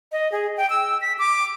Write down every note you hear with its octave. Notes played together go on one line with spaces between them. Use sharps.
D#5
G#4
G5
E6
B6
D6